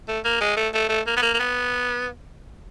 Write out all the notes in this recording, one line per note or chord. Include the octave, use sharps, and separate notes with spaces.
A3
A#3
G#3
A3
A3
A3
A#3
B3
A#3
A#3
B3